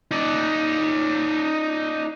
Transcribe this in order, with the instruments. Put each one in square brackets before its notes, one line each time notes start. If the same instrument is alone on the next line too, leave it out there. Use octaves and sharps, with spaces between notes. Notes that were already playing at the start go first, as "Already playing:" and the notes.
[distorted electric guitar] D#4 D5